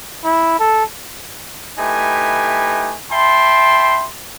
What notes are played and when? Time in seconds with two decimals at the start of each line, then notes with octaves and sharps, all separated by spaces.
0.24 E4
0.59 A4
1.78 A3 D#4 E4 G4 B4 G#5
3.11 E5 G5 A5 B5 C6